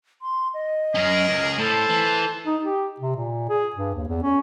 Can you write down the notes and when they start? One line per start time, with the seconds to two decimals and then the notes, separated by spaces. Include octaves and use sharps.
0.22 C6
0.54 D#5
0.95 F#2 C#4 G#4 A#4
1.29 C#2
1.58 A2 A4 C5 A5
1.90 E3
2.46 D#4
2.65 G4
3.00 C3
3.16 A#2
3.50 G#4
3.76 G2
3.95 D#2
4.08 E2
4.23 C#4